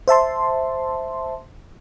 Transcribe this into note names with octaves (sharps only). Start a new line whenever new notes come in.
C5 E5 A5 C6